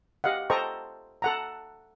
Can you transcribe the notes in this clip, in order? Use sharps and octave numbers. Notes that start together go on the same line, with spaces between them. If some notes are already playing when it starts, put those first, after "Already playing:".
G4 D#5 F5 F#5
A4 C5 D#5 G5 A#5 C#6
A4 F#5 A#5